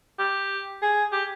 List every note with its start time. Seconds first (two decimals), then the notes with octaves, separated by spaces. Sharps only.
0.19 G4
0.82 G#4
1.12 G4